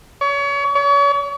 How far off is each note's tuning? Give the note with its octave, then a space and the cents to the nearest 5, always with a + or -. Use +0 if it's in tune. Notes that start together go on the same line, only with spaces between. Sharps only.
C#5 +35
C#5 +40